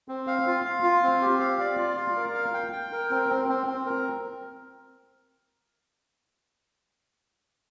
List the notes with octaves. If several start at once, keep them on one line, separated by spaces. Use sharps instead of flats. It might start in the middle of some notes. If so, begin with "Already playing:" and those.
C4
F5
F4
F5
F4
C4
G4
F5
D5
F4
F5
A#4
F5
G5
G5
A#4
C4
C4
C4
C4
A#4